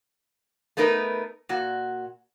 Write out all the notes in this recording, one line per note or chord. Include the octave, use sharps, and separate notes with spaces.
A3 B3 D#4 A#4 B4
A#2 F#4